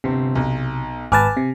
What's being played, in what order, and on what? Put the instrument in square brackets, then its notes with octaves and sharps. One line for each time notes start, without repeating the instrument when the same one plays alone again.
[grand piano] G1 C4 [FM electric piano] C3
[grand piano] B1
[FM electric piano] G#1 B4 A5 [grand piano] G#5 D6 F6
[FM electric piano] C3